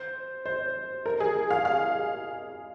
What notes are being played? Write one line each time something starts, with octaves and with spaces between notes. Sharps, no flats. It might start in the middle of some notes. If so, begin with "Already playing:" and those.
Already playing: C5
C5
A#4
G#4
F5
F5